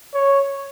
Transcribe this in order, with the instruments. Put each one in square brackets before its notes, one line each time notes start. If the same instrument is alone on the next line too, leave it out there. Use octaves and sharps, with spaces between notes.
[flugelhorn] C#5